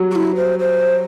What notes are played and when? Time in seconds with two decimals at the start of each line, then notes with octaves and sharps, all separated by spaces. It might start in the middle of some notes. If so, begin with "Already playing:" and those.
Already playing: F#3 G3
0.11 F#4
0.15 E4
0.35 C5
0.59 C5